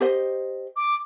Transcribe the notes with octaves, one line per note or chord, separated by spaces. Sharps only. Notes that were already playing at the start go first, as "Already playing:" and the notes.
G4 C5 D#5
D6